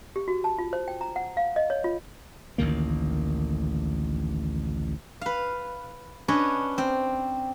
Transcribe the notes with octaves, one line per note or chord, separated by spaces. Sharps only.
G4
F#4
A5
F4
C5
G5
A#5
F#5
F5
D#5
C#5
F4
A1 D2 D#3 A#3
B4 F5
C#4 D4 B4 C#5 D#5
C4 G5